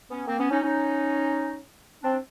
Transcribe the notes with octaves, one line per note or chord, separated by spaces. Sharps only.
B3 C#4
A#3 C4
B3 C#4
C#4 D#4
C#4 D#4
C4 D4